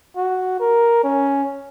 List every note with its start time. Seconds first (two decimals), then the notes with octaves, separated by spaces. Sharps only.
0.16 F#4
0.60 A#4
1.04 C#4